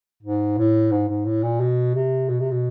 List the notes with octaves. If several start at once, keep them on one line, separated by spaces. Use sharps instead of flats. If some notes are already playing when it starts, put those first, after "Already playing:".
G#2
A2
G#2
G#2
A2
A#2
B2
C3
B2
C3
B2